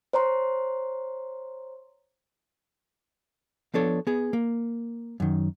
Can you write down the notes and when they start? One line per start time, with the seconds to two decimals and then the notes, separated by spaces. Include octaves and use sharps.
0.13 C5 C#5 A#5 C6
3.74 F3 B3 D4 A4 C#5
4.07 B3 G#4
4.33 A#3
5.20 F#2 D#3